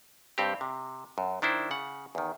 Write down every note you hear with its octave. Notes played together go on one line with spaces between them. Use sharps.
G2 C4 G4
C3
F#2
D#3 D4 E4 C5
C#3 F#5
E2 D#3